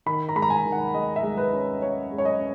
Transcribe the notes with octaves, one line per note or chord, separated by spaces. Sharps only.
D#3 B5
A#5
G#3 B5
A#5
G#5
D#3
F#5
G#3 D#5
E5
G#3
B4
C#4
C#4 C#5
G#3
C#5
D#5
C#4